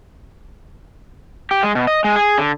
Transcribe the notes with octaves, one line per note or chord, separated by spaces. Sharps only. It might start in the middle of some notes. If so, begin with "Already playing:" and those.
G4
G#3
B2
D#5
G#3
G#4
D3